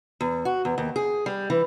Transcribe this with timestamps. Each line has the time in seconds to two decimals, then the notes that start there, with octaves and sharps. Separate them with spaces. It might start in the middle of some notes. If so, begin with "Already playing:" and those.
0.21 E2
0.45 F#4
0.65 E2
0.78 D#2
0.96 G#4
1.26 G3
1.50 E3